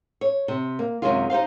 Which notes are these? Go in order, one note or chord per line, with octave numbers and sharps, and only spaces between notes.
C#5
C3
A#3
F#2 C3 D#3 G#3 C#4 F4
D#4 G4 C5 F5